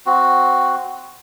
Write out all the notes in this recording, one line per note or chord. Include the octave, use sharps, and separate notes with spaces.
C4 F#4